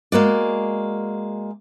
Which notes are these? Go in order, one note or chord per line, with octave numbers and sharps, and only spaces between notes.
G#3 A#3 F#4 D5